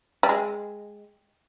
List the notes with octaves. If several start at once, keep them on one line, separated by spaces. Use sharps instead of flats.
G3
G#3